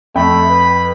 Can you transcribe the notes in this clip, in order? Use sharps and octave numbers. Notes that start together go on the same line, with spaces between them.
F2 A3 G5 B5
B4